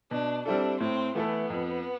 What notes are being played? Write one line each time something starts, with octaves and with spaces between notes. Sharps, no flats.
B2 D4
G3 C4 D4 E4 A4
A2 C4
E3 A3 B3 E4 A4
F2